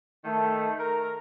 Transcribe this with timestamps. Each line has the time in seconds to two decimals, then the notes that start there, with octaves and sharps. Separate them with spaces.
0.25 D#3 A3
0.80 A#4 A#5